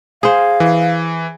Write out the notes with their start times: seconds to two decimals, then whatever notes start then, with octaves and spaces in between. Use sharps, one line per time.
0.23 G#4 C5 F5
0.60 E3